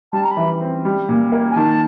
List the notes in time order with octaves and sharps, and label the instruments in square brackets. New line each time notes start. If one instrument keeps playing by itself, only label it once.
[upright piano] G3 [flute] A5
[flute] A#5
B5
[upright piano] E3
C4
G3
A#2
A#3
[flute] G#5
[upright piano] D#3 [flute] A5